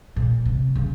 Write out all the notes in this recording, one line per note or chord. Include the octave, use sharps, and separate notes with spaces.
A#2
C3
C#3